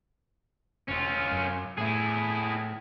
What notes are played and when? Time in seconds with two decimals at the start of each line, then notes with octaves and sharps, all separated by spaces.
0.89 E1 C#4 F4
1.32 F#2
1.78 A2 E4 G#4